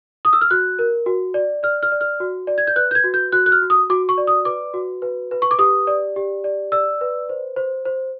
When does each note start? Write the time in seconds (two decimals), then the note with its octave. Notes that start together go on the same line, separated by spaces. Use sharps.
0.25 D#6
0.33 E6
0.41 F6
0.51 F#4 F#6
0.79 A#4
1.06 F#4
1.34 D5
1.63 D5 F6
1.83 F6
1.92 D5
2.01 F6
2.20 F#4
2.47 D5
2.58 G#6
2.67 G6
2.76 B4 F#6
2.91 G6
2.95 G#6
3.04 F#4
3.14 G6
3.32 F#4 F#6
3.46 F#6
3.52 F6
3.62 F#4
3.70 D#6
3.90 F#4 D6
4.09 C#6
4.18 D5
4.27 D#6
4.45 B4 D6
4.74 F#4
5.02 B4
5.31 B4
5.42 C#6
5.51 D6
5.59 G4 D#6
5.87 D5
6.16 G4
6.44 D5
6.72 D5 E6
7.01 B4
7.29 C5
7.56 C5
7.85 C5